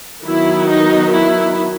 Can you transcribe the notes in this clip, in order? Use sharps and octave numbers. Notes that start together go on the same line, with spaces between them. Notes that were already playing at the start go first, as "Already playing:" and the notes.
D#3 F#3 B3 E4
D#4
E4